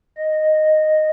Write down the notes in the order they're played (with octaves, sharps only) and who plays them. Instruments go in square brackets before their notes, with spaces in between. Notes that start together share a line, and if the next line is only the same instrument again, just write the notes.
[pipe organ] D#5